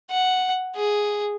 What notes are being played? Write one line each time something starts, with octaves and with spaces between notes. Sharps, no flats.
F#5
G#4